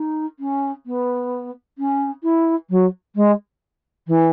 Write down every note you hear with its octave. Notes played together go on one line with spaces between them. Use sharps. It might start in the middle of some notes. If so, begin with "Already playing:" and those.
Already playing: D#4
C#4
B3
C#4
E4
F#3
G#3
E3